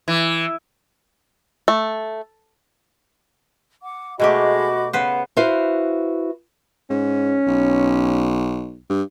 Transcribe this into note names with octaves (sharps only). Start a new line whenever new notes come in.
E3
A3
F#5 D6
B2 G#3 A3 F#4 G4 D#5 B5 D6
C#3 B3 B4 C5
E4 F#4 B4 C5 F5
G#2 C#4
B1
G2